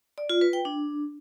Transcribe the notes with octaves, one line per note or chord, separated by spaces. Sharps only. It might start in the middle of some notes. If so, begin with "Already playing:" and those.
D5
F4
B4
G5
D4